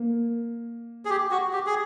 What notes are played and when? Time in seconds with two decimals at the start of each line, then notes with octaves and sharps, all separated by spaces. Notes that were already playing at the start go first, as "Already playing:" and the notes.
Already playing: A#3
1.05 G#4
1.10 G4
1.31 F#4
1.53 G4
1.66 G#4